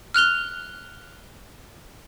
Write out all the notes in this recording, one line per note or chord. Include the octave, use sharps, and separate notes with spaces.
F6 F#6 F7 G7